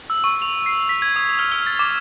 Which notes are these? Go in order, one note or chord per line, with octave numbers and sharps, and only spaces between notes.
E6
C#6
F7
C7
B6
G#6
D#6
F6
F6
A6
D6